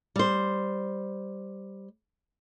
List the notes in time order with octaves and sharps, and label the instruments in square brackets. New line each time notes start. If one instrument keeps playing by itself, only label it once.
[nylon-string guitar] G3 C5